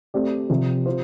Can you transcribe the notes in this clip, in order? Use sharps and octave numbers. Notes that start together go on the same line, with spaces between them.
A3 C4 G4 D5
C3 F3 C4 G4
F4 C5